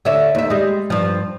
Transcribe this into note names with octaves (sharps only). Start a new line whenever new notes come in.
D3 C#5 E5
D#2 E5
G3 G#3
G2 F3